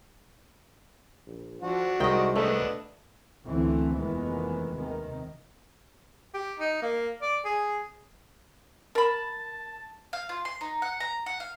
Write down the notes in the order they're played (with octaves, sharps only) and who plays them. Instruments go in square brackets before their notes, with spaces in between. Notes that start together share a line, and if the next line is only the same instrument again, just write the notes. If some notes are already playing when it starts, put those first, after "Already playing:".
[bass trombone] A#1
[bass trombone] F3 [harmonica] D4 F#4
[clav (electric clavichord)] C2 D#3 [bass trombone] G#3 [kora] D#5 G5
[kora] A3 [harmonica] B3 D4 D#5
[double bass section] C#2 D3 E3 A3 C4
F1 D#2 D#3 E3 G#3 B3
C3 D#3
[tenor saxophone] G4
D#4
A#3
D5
G#4
[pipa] A#4 B5 [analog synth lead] A5
[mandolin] F5
F4
C6
D#4
F#5
A#5
F#5
F5